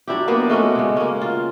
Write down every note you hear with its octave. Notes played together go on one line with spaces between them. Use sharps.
F#3 D4 E4 G4
A#3 B3 D4
G#3 A3 C#4 F#4
C#3 G#3
A#3 C#4
F4